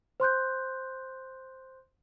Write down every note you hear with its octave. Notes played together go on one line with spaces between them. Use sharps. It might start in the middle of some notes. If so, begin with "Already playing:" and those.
C5 C6 F#6 G6